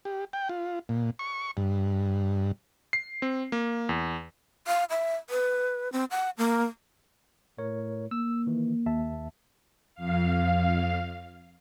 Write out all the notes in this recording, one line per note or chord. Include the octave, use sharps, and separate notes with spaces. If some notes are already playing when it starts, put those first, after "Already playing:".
G4
G5
F4
A#2
C#6
G2
C7
C4
A#3
E2
F5
E5
B4
C4
F#5
A#3
A2 A#4 C#5
A#3 E6
D#3 E3
D#2 E5 A5
F2 F5